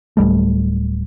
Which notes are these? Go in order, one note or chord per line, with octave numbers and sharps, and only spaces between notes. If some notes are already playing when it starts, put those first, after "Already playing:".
D1 C2 G3 A3